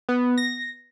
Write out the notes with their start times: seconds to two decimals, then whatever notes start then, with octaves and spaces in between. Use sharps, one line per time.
0.09 B3
0.38 A#6